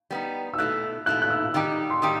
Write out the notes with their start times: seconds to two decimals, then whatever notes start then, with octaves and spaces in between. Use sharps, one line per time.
0.10 G3 B3 D#4
0.54 E6
0.58 B2 A3 E4 F#6
1.06 B2 A3 E4 F#6
1.22 F#6
1.30 E6
1.54 D#3 G3 D#4 G4
1.90 C6
2.02 D#3 G3 D#4 G4 D#6